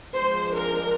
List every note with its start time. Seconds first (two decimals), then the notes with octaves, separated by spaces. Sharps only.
0.16 F3 G#3 D4 C5
0.54 A#4